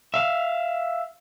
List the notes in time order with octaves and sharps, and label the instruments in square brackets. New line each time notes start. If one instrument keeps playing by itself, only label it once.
[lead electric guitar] E5 F5